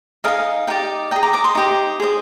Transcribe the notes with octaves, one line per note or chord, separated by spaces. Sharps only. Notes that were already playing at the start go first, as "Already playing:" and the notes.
D#4 A#4 D#5 F5 G#5
D#4 G4 D5 D#5 G5
G#4 D#5 G5 A#5
A#5 D6
A#5 D6
C6 D#6
D#4 G4 C5
G#4 C5 D#5